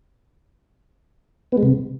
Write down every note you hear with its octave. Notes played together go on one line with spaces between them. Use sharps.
B3
G#3
C3